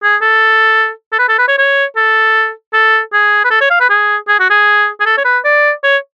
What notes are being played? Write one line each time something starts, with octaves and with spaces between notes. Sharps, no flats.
G#4
A4
A4
B4
A4
B4
C#5
C#5
A4
A4
G#4
B4
A4
C#5
F5
B4
G#4
G#4
F#4
G#4
G#4
A4
C#5
B4
D5
C#5